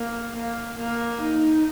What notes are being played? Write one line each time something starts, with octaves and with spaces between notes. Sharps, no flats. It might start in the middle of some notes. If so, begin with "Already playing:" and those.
Already playing: A#3
A#3
A#3
D#4